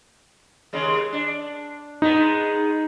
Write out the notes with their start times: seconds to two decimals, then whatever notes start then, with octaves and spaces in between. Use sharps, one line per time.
0.73 D#2 C#3 G#3
1.13 D4
2.02 G#3 B3 D#4